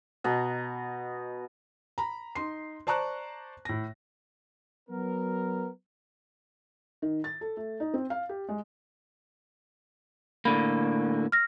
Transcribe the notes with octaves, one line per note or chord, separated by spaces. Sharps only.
B2 D#5 A#5
A#5 B5
D#4 C6 C7
C5 D5 A5 A#5 C#6 F#6
A2 A#6
F#3 B3 A#4
D#3
A6
A4
A3
D#4
C4
F5
G4
G#3
A2 D3 A#3 B5
F6 A#6